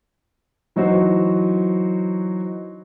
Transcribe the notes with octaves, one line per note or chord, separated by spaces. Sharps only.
E3 F#3 D#4 F#4 C5